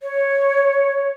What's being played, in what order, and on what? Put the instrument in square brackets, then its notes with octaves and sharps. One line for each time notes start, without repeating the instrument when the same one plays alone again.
[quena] C#5